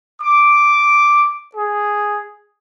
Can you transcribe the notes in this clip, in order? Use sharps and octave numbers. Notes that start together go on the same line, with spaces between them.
D6
G#4